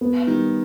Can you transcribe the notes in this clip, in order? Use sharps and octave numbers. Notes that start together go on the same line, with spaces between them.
B3
D#3 G3